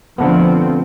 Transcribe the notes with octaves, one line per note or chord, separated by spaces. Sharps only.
D3 F3 A3 B3 C4